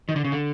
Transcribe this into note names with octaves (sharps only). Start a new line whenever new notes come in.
D#3
D3
C#3
D3